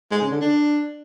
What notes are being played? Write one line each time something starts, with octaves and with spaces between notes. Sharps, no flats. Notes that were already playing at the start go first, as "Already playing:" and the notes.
G#3
C#3
D3
D4